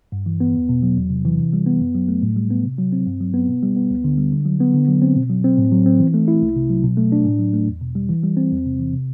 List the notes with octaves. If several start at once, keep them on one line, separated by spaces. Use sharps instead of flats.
G2
E3
B3
E2
B2
F#3
E2
C3
E3
C3
G3
B3
F#2
F#3
A3
A2
G3
B3
C3
F#3
C4
G2
F#3
B3
B2
G3
B3
D2
D3
G3
D3
F#3
B3
D3
F#3
C4
B2
F#3
C4
A2
F#3
C4
E3
A3
E4
C2
C3
F#3
B2
A3
D4
A2
F#3
A3
E2
B2
G3
E3
G3
C4
E2
C3
E3
C3